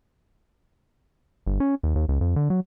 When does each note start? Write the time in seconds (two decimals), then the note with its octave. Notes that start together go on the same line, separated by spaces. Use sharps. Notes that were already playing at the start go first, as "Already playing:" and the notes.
1.46 G1
1.60 C#4
1.83 D#2
1.95 D#2
2.09 C#2
2.21 F2
2.36 D3
2.50 F#3